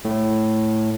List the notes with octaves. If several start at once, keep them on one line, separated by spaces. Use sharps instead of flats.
A2